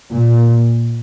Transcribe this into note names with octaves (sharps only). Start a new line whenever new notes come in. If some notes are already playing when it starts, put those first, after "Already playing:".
A#2